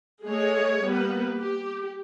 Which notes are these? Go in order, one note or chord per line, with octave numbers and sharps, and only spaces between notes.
G#3 A3 G#4 C#5
G3 A#3 B3 B4
G4